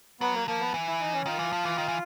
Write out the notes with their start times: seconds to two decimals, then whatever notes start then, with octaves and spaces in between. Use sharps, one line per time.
0.21 F#3 B3
0.34 A#3
0.48 F3 A#3
0.60 B3
0.74 E3
0.87 E4
1.00 D#4
1.13 C#4
1.26 D#3 F4
1.39 E3
1.52 F3
1.65 E3
1.78 D#3
1.88 E3